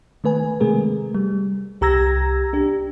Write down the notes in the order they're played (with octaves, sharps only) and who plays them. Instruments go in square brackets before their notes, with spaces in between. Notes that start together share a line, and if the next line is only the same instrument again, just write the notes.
[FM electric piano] D#3 A3 B4 G#5
C3 G#3 A3 G#4 A#4
G3
C2 G4 A#5 E6 G#6 A#6
D4 G4